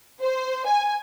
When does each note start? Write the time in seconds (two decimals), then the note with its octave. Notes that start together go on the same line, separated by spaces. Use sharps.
0.22 C5
0.67 G#5